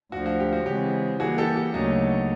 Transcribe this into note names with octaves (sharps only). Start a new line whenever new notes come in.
D2 D3 F3 F#4
F#4
G4
F#4
C#3 E3 G#3 C4 G4
E3 G3 A#3 F#4 G#4
G4 A4
G4
D2 C#3 F#3 A#3 D#4 F#4